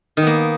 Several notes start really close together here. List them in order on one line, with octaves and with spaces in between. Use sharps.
D#3 B3 A#3